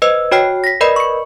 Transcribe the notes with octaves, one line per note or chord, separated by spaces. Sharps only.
B4 C5 D#5 E6
F#4 C#5 G5 F6 C7
A#6 B6
A#4 B4 D5 D#5 B5
C#6 C#7